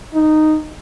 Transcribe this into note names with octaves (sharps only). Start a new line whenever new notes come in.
D#4